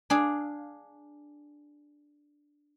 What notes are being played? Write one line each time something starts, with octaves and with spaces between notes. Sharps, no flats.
D4 G#4 F5